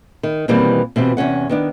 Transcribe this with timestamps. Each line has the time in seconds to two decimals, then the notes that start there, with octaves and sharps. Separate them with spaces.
0.23 D#3
0.48 B2 D#3 E3 G3 A#3 C4
0.96 B2 E3 C4 F4 G4
1.17 E2 C3 C#4 F#5
1.49 D#3 B3 D4